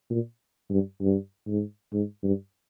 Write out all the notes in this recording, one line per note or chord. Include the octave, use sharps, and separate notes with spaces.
A#2
G2
G2
G#2
G#2
G2